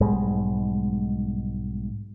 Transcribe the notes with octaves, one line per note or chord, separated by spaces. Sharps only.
B1 G#2 G3 G#3